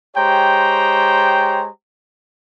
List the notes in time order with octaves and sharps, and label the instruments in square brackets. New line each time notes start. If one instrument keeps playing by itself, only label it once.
[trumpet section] G#3 G4 C5 C#5 G5 A#5